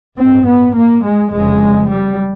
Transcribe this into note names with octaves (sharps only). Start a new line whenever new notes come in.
A1 G2 C4
B3
A#3
G#3
F1 F2 C#3 G#3
G3